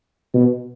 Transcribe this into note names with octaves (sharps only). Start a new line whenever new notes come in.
B2